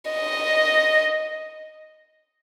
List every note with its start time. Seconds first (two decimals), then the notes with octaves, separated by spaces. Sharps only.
0.11 D#5